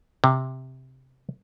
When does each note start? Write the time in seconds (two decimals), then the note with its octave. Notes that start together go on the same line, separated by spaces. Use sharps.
0.24 C3